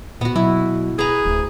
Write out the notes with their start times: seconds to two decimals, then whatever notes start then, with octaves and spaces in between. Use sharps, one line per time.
0.21 A#2 B3 F#4
0.36 B2 F#3 E4
0.99 G#4 B4 A#5
1.26 D1 D2